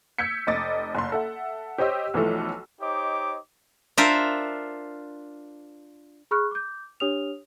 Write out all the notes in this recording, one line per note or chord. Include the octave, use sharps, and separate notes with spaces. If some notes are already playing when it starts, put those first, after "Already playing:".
E6 G6 G#6 B6 C#7
F1 D#5 D6 A6
F#1 C6
A4 E5 F#5
G4 C5 C#5 D#5 G5 E6
B1 E3 F3 A3 A4
D#4 G4 C5 C#5 D#5 D6
D4 F4 A#4 C5 E5
G#4 B5 C#6 F6 F#6
D6 G6
D4 G4 C#5 D#6 F6 F7